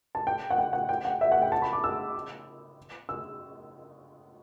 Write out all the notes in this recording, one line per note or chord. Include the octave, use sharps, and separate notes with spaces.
A5
G5
F#5
G5
F#5
G5
F#5
E5
F#5
G5
A5
B5
D6
E6
E6